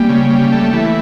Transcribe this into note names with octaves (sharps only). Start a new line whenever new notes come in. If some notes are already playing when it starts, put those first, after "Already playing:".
Already playing: G3 A#3
C#3
G3
A3
E3